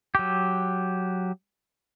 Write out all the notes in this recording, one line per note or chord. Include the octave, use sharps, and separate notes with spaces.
F#3 G4